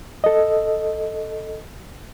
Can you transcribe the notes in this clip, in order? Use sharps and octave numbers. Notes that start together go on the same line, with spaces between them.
A4 D#5